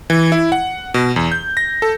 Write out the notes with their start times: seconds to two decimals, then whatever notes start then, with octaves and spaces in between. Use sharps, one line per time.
0.10 E3
0.32 E4
0.52 F#5
0.94 B2
1.16 E2
1.32 G6
1.57 A#6
1.82 A4